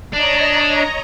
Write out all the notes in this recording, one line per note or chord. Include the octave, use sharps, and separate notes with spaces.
D4 C#5 D#5 A#5